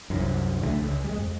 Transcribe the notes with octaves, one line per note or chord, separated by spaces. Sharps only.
C2 F#2
C#2 D3 F3 A3
C#2
G3 G#3
F2